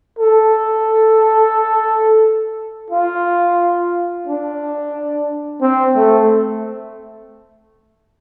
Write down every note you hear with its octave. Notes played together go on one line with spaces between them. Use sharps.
A4
F4
D4
C4
A3